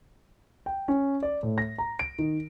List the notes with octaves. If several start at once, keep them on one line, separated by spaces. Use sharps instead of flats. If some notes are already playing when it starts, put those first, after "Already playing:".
G5
C#4
D5
A2
A#6
A#5
D7
D#3